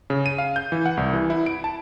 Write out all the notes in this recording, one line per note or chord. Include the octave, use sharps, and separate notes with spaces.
C#3
D#7
F5
G6
E3
F#5
C2
E3
E4
D7
A5